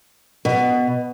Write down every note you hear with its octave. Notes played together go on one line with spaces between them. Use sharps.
B2